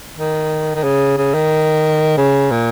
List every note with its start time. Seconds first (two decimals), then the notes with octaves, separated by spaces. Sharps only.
0.18 D#3
0.75 D#3
0.83 C#3
1.18 C#3
1.34 D#3
2.17 C#3
2.51 A#2